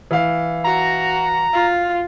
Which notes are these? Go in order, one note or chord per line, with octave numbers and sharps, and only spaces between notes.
E3 F5
F#4 A#5
F4